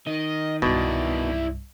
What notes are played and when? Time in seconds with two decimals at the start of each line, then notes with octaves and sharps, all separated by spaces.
0.07 D#3 D#5
0.62 C2 G2 B2 E4 D5